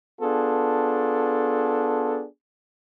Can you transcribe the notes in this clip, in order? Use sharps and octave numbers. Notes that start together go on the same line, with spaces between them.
B3 D4 F4 G#4 A4